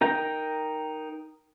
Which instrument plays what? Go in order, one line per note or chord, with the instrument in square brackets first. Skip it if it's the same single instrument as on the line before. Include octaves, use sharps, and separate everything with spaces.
[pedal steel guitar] D#4 A#4 G5